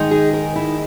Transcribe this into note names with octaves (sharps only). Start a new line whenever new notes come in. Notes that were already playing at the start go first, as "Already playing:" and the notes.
Already playing: D#3 G#3 D#4
G#4
A#4
E4